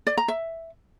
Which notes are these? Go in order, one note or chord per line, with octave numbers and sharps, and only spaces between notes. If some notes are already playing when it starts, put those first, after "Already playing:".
D5
A#5
E5